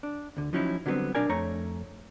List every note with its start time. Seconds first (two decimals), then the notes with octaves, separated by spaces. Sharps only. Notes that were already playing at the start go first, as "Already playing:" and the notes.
0.03 D4
0.37 D2 D3
0.53 F3 F#3 C#4 D#4 E4
0.86 D3 F#3 G3 A3 B3 C4
1.15 B1 D4 A#4 D5 G#5
1.29 F2 A3 C#5 A#5